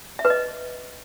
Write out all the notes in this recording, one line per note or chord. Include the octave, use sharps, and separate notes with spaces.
E5
B4
D#5